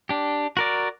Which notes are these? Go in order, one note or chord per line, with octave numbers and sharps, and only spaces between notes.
D4 G4
F#4 A#4 D5